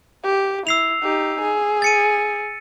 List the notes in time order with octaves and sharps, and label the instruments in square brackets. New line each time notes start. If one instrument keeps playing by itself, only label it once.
[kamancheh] G4
[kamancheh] E4 [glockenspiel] E6 C7 F7
[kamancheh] D#4 G4
G#4
[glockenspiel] A6 C#7 D#7